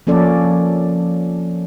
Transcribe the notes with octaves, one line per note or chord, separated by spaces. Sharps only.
F3 A#3 C#4 A4 D5